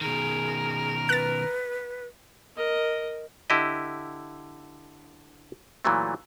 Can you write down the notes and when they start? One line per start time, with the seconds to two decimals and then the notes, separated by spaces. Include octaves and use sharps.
0.01 B2 D#3 G#4 A#4
1.09 B4 F#6 A6
2.56 A#4 D#5
3.50 D3 E4 G4 D#5
5.85 A#2 E3 F#3 A3